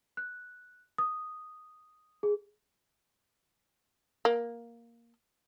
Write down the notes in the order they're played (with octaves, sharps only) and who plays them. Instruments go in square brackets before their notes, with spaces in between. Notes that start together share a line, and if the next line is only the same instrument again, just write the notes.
[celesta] F#6
D#6
G#4
[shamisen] A#3